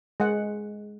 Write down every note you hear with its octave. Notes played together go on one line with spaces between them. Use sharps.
G#3 F#5